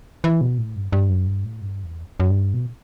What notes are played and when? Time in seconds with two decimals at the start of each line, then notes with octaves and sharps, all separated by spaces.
0.24 E3
0.41 B2
0.58 A2
0.76 G2
0.93 G2
1.09 F#2
1.27 G2
1.45 A2
1.61 G2
1.84 E2
2.20 F#2
2.30 G2
2.54 B2